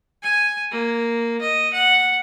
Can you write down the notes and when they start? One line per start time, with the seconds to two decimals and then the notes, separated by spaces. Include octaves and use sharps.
0.23 G#5
0.72 A#3
1.41 D#5
1.73 F#5